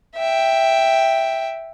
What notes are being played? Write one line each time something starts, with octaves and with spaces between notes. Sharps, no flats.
E5 G5